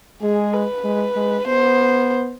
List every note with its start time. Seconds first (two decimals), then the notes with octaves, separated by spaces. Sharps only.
0.22 G#3 G#4
0.54 B4
0.84 G#3
1.16 G#3
1.47 B3 C5